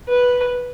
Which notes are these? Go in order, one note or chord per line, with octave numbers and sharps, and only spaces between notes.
B4